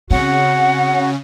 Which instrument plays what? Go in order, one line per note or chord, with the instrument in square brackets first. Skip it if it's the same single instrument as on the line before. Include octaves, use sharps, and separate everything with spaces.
[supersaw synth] C#3 C#4 [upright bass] C4 [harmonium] F#4 [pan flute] F#5